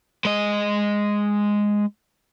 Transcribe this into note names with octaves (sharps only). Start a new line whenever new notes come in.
G#3 D#5